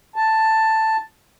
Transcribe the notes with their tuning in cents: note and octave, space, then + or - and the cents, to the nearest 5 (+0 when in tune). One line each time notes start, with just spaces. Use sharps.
A5 +5